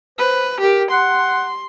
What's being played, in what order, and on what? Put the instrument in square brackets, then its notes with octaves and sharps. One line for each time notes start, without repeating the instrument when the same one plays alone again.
[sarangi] B4 [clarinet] C5
[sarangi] G4 [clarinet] A#4
[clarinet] F#5 [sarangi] C6